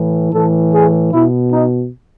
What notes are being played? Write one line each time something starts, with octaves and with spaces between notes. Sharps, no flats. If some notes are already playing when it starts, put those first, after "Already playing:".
Already playing: A2 E3
A2 E3 A4
G#4
B2 E4
D#4